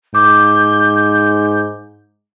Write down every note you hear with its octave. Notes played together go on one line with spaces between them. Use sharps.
G#2 D6 G6